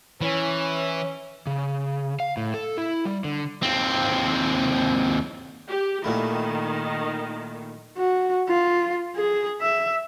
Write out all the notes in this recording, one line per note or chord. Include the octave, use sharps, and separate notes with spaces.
E3 C#4
C#3
F5
A2
A4
E4
G3
D3
D#2 C4
G4
A#2 D#3 A3 E4
F#4
F4
G#4
E5